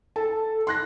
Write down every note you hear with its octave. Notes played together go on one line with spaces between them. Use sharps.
A4 A5
C6 F#6 A#6